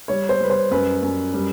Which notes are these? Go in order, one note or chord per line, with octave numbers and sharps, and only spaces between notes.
G3 C#5
C5
G3 B4
C5
F#2 B4
F#2
G3